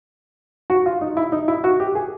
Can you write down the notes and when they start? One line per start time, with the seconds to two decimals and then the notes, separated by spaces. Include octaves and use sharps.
0.70 F#4
0.86 F4
1.01 D#4
1.17 E4
1.32 D#4
1.48 E4
1.64 F#4
1.80 G4
1.95 G#4